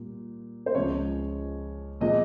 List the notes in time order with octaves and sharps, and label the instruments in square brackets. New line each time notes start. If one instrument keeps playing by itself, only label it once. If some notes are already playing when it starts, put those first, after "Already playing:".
Already playing: [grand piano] A#2 G3 A#3
C5
C#2 C#3 F3 G#3 C#5
A#2 F3 G#3 D#5